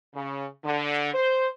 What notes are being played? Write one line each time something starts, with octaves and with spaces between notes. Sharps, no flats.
C#3
D3
C5